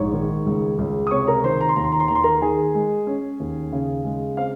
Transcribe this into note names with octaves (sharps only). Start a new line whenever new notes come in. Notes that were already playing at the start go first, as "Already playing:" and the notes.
Already playing: A#1 G#2 C#5 C#6
D#3
C#2
C#2
D#6
C3 C#5 C#6
A#4 A#5
D#3 C5 C6
A#5
C6
D#2 A#5
C6
A#5
C6
D#2 A#5
C6
A#4 A#5
D#3 G#4 G#5
G#3
C#4
D#2
C#3
G#3
C4 F5